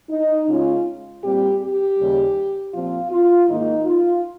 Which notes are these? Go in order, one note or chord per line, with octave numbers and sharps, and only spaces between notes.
D#4
C#3 G#3 C#4 F4
A#2 G3 C4 G4
G4
D#2 C#3 G3
A#2 F3 C4 F4
F4
G#2 D#3 A#3 D#4
F4